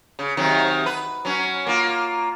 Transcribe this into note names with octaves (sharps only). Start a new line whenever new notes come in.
C#3
C3 D#3 F#3
B4
F#3 C#4
A#3 F4